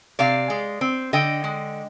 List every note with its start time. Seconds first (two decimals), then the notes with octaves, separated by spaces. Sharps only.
0.19 C3 D5 F5
0.50 G#3
0.81 C4
1.13 D3 D#5 G5
1.44 G#3